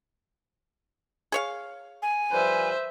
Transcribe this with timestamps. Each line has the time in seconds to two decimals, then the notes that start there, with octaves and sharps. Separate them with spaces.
1.32 G#4 C#5 F5
2.02 G#5
2.32 F3 G3 B4 C5 E5